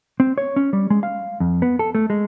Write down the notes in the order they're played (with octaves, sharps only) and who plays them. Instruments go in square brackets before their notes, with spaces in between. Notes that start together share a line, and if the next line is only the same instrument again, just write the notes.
[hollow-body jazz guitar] C4
C#5
C#4
G3
G#3
F5
F2
B3
A4
A3
G#3